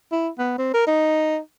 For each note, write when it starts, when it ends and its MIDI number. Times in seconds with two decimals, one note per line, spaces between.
0.12 0.29 64
0.38 0.56 59
0.58 0.73 60
0.74 0.86 70
0.87 1.39 63